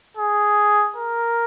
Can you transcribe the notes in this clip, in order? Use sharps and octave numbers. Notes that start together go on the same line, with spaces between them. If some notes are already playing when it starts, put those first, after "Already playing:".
G#4
A#4